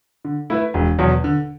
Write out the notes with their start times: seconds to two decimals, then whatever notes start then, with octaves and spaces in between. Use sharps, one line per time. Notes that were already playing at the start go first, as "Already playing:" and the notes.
0.25 D3
0.50 A3 E4 B4 E5
0.74 E1
0.99 E2 B2 F#3
1.24 D3